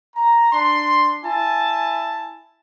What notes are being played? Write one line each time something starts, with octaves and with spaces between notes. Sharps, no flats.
A#5
D4 C6
E4 G#5 A5